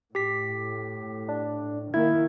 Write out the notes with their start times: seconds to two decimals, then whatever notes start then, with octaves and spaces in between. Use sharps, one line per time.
0.15 A2 G4 B6
1.28 D4
1.94 D#3 A#3 E4 G#6